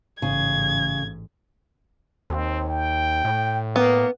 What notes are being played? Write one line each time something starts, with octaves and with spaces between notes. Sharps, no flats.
A1 G#2 C#3 G#6
D#2 C4
G5
A2
A#3 B3